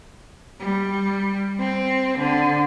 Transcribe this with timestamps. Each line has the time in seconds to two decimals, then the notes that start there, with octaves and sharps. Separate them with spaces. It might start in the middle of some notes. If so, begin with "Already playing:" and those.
0.60 G3
1.59 C4
2.19 D3